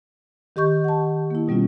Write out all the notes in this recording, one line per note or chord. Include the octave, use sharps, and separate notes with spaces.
D#3 G4 D#5 C#6 G6
F#5 A5
A#3 E4
B2 G3 B3 C#4 F4